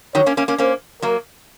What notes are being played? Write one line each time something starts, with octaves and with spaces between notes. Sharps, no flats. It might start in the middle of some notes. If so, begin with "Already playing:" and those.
D#3 F#3 C#5
A#3 C#4
A#3 C#4
A#3 C#4
A#3 C#4 C5
F#3 A#3 A#4